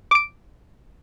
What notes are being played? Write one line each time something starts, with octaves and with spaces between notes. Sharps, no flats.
D6 D7